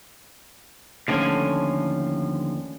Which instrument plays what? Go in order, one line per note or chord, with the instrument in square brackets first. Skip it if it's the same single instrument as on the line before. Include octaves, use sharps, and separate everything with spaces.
[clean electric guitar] D#2 D3 F3 [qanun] A3 C#4 G#5